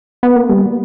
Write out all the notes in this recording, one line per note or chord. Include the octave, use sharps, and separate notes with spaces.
B3
A#3
G3